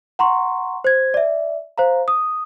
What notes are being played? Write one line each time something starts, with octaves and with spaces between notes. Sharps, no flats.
F#5 A#5 C6 C#6
C5 G#6
D5 E5
C5 F5 A#5
D#6